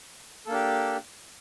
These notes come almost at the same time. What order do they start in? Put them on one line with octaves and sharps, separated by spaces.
A4 A#3 D4 G4